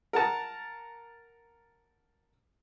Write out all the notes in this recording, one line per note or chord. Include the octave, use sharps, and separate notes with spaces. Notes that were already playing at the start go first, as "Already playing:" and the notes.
A#4 F#5 A5 A#5